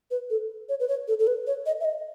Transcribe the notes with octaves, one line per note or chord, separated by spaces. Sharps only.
B4
A4
C#5
B4
C#5
A4
A4
B4
C#5
D#5
E5
D#5